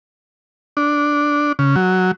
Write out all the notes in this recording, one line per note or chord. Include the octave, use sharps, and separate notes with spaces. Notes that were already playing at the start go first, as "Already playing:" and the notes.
D4
C#3
F#3